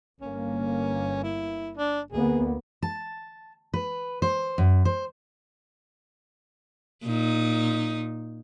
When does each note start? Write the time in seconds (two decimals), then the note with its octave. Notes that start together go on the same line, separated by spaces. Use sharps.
0.21 G1 A#3 C#4
1.23 E4
1.77 D4
2.12 D2 A#3 B3 G#4
2.82 A5
3.74 B4
4.22 C5
4.58 F#2
4.85 C5
7.05 A#2 D#4